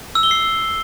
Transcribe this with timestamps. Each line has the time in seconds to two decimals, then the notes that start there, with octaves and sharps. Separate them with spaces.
0.15 E6
0.23 G7
0.31 C7